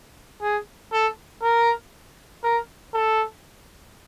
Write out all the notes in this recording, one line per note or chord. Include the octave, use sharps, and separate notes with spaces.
G#4
A4
A#4
A#4
A4